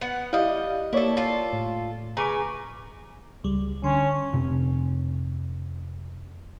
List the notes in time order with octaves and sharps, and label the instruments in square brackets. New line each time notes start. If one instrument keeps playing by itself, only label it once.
[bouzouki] B3 F#5
[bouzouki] G3 D#5 [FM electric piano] E4 D5 F5
[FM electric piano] A#3 C#5 D5 [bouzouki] E4 A4
[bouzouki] F4 A4
[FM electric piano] A2
[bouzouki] C#3 B4 G#5 [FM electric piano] A#5 C#6 D6
[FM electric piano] C#2 G3
[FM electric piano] D3 C6 [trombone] C#4
[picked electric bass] F1 C3